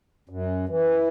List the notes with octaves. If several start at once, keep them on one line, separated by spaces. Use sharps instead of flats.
F#2
E3